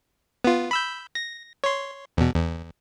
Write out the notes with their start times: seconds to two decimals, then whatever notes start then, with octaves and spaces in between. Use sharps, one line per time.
0.44 B3 F4
0.71 B5 E6 G6
1.15 A#6
1.64 C#5 C6
2.17 E2 B2
2.35 E2